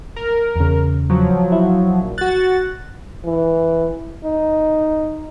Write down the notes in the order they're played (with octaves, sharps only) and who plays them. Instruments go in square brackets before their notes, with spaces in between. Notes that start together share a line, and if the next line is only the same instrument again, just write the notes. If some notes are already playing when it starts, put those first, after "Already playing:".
[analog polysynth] A#4
[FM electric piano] E2 C#3
[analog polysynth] F3 F#3
[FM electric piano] E4
[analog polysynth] A#1
[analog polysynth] F#4 A6 [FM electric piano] F#6
[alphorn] E3
D#4